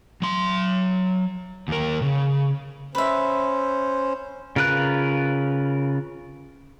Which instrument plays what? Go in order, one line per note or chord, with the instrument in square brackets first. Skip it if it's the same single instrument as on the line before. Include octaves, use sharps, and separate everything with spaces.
[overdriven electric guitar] F#3 C6
D#2 A#4
C#3
[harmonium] C#4 C5 [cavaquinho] B4 E5
[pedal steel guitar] C#3 F4 A#4 B4 F#6